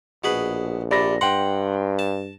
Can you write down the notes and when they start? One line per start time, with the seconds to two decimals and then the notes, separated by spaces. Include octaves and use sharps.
0.24 A#1 B2 G#4 B4
0.91 C3 D5 B5 A#6
1.21 G2 F#5 G5 C6
1.99 A5